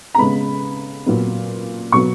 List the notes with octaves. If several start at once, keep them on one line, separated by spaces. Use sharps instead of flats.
A#5
C#3 G#3 B3 B5
A#2 F#3 B3
B2 F#3 B3 C#6